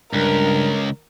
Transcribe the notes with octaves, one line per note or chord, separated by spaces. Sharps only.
C#2 G2 A#4